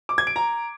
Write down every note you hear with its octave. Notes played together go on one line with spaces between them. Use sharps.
D6
G#6
D7
A#5